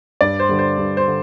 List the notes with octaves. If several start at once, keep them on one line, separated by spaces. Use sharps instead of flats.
G2 D5
C5
D3 G3
C5
G2
C5
D3